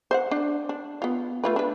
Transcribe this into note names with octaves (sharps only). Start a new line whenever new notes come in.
C5 E5 F#5
D4
D4
B3 F4
A3 F4 B4
D4 B4